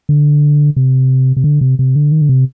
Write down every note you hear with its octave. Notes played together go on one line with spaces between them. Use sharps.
D3
C3
C3
D3
C3
C3
D3
D#3
D3
C3